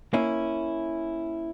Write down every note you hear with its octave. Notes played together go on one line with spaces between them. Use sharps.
A#3 C#4 E4